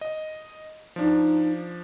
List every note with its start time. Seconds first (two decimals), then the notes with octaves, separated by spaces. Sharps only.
0.01 D#5
0.96 F3 D4 D#4